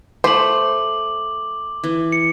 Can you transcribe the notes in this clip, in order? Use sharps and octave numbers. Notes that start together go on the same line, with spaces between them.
A3 C5 D6 F#7
E3
C#7